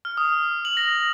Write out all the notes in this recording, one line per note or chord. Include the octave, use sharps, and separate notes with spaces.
F6
D#6
F#7
A#6